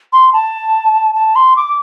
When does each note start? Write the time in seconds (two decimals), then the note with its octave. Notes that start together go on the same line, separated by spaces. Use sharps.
0.13 C6
0.33 A5
1.15 A5
1.36 C6
1.56 D6